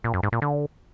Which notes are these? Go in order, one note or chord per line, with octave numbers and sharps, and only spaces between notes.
A#2
F#2
G#2
A#2
D3